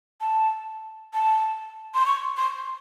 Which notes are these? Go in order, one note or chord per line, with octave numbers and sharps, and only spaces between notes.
A5
A5
C6
C#6
C6